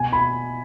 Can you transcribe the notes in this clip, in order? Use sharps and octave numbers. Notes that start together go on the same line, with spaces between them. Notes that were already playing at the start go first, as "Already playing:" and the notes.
Already playing: B2 G#5
B5